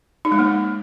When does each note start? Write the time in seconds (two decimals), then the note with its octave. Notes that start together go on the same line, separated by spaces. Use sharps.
0.25 D#4
0.32 G#3
0.39 A#3